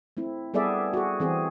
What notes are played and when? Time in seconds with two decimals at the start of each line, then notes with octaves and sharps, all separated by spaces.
0.17 A3 C4 E4
0.54 G3 B3 G#4 A4 D5 E5
0.94 F#4 G#4
1.20 E3 C4 G#4